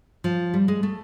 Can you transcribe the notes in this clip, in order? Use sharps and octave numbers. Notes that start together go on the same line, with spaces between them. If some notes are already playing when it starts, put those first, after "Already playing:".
F3
G3
G#3
A3